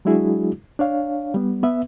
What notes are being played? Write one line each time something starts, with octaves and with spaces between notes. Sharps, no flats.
F#3 G#3 D4 E4 F#4 G#4
D4 C#5 F5
G3 B3
B3 B4 E5